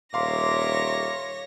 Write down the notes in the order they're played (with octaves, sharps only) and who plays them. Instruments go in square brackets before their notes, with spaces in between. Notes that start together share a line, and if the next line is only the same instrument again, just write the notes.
[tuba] D#1 [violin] C#5 A#6 [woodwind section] E5 A#5 D6 [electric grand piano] F5 C6